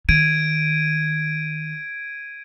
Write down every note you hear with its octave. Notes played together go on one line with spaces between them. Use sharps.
D#3 G#6 D7 D#7